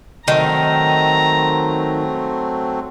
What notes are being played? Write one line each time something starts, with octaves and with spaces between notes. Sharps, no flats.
D#3 F#3 A3 C4 A#5